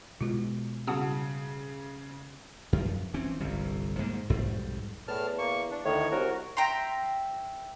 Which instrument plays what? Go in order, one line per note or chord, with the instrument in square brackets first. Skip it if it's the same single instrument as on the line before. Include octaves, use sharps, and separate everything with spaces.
[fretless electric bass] B2 G#3 [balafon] E4 F4
[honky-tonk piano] C#3 [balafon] G3 E4 F#4 [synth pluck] F#5 A5 D#6
[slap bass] F#2 F3
E3 C4 C#4
G1 C2 F2
G#2 A#3
B1 F2 G#2 G3
[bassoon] E2 [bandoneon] A2 A5 F6
[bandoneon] A#3 C#6
D4
[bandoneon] D2 D#3 C#5 [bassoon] A2
[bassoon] C2 [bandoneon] F#4 A#4
[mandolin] E5 G5 A#5 C6